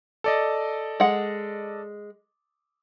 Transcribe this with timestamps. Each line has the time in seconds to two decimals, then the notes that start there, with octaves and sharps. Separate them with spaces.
0.24 A4 D5 D#5
1.00 G#3 F#5